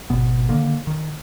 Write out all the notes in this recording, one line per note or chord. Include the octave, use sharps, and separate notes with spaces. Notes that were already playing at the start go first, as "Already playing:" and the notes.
G#1 B2 B3
D3 D#3 A#3
D#3